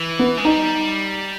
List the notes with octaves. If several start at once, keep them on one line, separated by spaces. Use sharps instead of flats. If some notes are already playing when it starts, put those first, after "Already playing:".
Already playing: E3
B3
G#3
G3 D#4